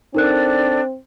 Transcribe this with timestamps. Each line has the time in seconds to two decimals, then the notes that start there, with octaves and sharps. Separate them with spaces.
0.15 C4 D4 D#4 A4 A#4 D5 F#6